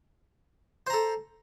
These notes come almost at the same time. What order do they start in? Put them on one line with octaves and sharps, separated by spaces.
C5 A#5 A4